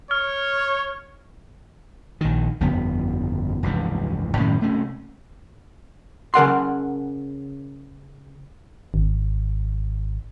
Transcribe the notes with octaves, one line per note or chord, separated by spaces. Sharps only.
C#5 F6
A#1 D#3
G1 F2 C#3 B3
F1 C#2 G2 E3
F#2 A2 D#3 C#4
C3 A3 C#4
C#3 A#4 F#5 C6
G#1